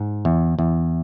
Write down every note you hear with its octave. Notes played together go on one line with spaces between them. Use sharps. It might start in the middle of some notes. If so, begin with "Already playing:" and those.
Already playing: G#2
E2
E2